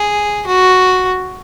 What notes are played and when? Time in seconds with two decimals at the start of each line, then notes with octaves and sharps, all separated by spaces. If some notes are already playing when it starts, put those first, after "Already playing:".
Already playing: G#4
0.47 F#4